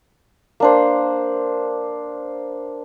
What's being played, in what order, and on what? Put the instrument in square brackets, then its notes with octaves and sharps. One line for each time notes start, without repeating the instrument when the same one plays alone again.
[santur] A#3 D4 C5